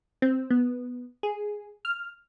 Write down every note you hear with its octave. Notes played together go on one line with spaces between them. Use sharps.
C4
B3
G#4
F6